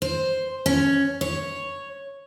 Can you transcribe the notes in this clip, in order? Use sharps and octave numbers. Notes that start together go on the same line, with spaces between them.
C5
C#4
C#5